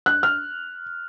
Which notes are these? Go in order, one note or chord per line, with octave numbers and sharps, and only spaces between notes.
F#6
F6